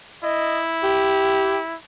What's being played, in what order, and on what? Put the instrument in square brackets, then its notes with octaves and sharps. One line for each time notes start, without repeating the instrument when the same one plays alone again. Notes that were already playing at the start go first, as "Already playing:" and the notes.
[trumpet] E4 [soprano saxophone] D#5
[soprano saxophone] G4